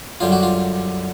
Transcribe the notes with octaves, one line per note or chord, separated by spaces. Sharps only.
F#2 D3 G3 F4
F#4
F4